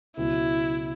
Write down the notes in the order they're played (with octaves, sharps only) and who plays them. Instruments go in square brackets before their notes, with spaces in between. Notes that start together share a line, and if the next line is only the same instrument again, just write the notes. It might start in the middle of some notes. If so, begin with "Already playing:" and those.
[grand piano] C#2 B2 F#3 [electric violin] E4